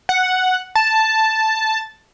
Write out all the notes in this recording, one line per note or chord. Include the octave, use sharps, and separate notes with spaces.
F#5
A5